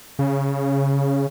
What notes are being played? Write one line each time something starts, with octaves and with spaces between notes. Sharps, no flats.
C#3